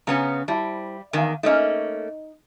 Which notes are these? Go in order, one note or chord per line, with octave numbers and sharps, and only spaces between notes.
C#3 B3 C#4 A#5
G3 E4 C5 A5
E2 D#3 F5 G#5
A3 A#3 C#4 D#4 D#5 G#5